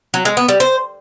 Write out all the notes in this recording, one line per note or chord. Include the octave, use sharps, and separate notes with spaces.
F#3
G#3
B3
G3
C5